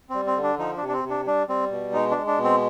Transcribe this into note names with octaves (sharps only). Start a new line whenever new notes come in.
G3 C4
C4
D3
D4
F3 D#4
D4
C3
D4
C4
C3
D4
G3 D4
G3 C4
B2
G#3 D#4
D4
G#3
D4
B2
C4